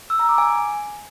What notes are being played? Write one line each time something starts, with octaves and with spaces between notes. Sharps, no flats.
E6
A#5
D6
G#5